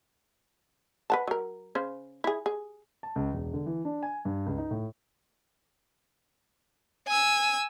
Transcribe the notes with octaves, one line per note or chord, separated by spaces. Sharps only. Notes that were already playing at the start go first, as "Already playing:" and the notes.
B4 F#5 A5
F#3 A#4
C#3 C#4 C5
E4 G#4
G#4
A5
C#2
E1
D3
E3
D4
G#5
G2
C#2
D#4
A2
G#5 E6